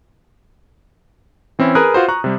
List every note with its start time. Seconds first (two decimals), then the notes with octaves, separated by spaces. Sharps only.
1.59 E3 C4 C#4 E4
1.75 G#4 A#4 B4 D#6 F#6
1.94 F4 F#4 C5
2.09 A#5 C#6 F#6
2.24 C3 G3